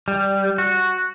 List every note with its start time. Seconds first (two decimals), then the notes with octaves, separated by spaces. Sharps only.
0.08 G3
0.58 F#4